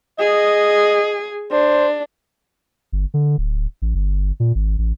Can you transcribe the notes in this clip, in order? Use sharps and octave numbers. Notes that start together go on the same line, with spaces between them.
G#4 D#5
D4 C5
G1
D3
D1
A1
G1
A#2
G#1
A1